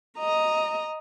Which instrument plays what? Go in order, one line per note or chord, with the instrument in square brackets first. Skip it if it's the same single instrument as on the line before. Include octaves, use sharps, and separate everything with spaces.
[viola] D#5 A#5